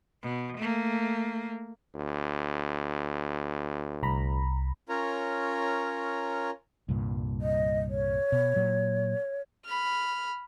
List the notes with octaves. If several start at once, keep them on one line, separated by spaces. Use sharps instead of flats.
B2
A3 A#3
D2
C2 A#5 B5
C#4 F4 A#4 C#5 A#5
C2 G2 A#2
D#5
C#5
B2
A#2 F#3
B5 F6